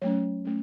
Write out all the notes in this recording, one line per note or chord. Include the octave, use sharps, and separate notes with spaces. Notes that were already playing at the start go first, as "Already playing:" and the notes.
F#3 A3 C#4 C#5
A3 C#4